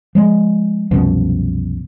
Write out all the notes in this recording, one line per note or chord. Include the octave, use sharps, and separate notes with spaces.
F3 G#3
C2 F#2 B2 F3